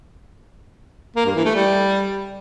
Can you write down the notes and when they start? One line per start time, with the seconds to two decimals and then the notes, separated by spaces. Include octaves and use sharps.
1.16 A#3
1.26 G2
1.35 E3
1.45 A3
1.55 G3